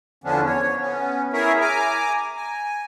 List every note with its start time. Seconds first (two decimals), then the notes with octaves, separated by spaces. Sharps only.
0.24 E2 D3 F3 B3 C#4 D4
0.46 C#5
0.80 B3 C#4
1.33 E4 G#4 A#4 C#5 E5
1.61 G#5 A#5 D6
2.36 G#5